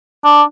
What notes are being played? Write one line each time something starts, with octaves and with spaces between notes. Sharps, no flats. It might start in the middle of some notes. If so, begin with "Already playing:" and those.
D4